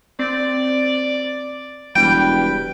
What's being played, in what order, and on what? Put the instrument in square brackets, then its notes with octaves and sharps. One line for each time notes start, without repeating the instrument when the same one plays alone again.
[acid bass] C4 [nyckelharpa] D5
[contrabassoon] E1 [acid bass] G3 [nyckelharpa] B4 [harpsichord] G5